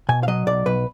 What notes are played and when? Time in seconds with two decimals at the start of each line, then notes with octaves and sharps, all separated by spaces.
0.09 B2 G#5
0.23 F5
0.28 F#3 D#5
0.47 B1 D5
0.66 B1 B4